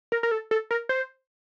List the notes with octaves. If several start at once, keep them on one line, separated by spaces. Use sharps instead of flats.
A#4
A#4
A4
A4
A#4
C5